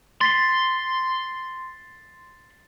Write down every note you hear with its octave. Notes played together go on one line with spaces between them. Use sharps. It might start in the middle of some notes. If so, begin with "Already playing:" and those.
C6 A6 B6 C7